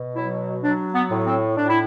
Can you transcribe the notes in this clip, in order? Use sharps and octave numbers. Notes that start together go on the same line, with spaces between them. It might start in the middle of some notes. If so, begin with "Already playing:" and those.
Already playing: B2
F#3 E4
F#3 D4
B3
A2
C4
A2 D4
E4